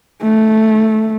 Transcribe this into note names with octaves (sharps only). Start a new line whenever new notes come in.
A3